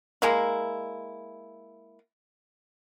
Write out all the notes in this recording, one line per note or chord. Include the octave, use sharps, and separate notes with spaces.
G#3 A#3 E4